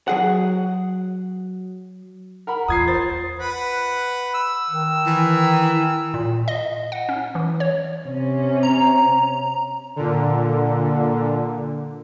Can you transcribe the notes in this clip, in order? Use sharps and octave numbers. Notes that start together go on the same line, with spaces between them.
F#3 G#4 F#5
A#4 F#5 B5
E2 F4 D#6 G#6 C7
C5 A6
B4 F#5 B5
E6
D#3
E3
A#2
D#5
F#5
C#4
E3
C#5
C3 C#4
A#5
A#2 D3